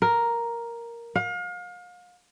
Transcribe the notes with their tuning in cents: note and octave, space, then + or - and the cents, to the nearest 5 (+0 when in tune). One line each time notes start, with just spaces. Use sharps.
A#4 +5
F5 +35